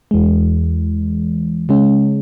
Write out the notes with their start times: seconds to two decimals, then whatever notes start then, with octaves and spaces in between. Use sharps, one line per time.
0.11 E2 E3 G#3
1.69 C#3 G#3 C#4